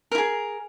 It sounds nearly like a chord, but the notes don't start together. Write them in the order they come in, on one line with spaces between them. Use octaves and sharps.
A#4 E4 G#4